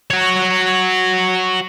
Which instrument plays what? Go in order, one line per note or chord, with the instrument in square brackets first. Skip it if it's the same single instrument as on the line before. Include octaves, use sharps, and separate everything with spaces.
[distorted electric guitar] F#4 C#5